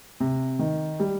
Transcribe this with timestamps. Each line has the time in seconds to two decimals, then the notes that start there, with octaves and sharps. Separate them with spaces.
0.20 C3
0.59 D#3
1.00 G3